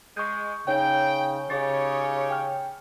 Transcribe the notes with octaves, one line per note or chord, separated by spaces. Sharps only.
G#3 C#6 G6
C#3 D#4 C#5 G5
C#3 D#4 G4 C#5 A6
G5 F6